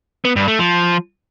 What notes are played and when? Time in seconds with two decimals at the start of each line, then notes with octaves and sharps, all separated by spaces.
0.25 B3
0.36 G2
0.48 A3
0.59 F3